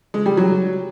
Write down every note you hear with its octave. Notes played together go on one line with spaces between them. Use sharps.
G#3
G3
F#3